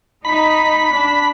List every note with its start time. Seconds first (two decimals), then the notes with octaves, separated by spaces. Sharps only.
0.25 D#4 B5
0.91 D4